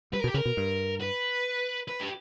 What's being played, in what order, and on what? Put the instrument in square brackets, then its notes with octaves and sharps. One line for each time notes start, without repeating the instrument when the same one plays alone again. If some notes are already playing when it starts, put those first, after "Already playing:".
[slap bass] G3 [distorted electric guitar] B4
[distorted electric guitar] A#4
[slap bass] B2
[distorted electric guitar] G4
[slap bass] C#3 [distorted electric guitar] A#4
[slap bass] B2
G2
[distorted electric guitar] B4
B4
G4